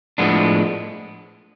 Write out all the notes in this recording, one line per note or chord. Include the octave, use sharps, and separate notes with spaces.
A2 F3 G#3 B3 D4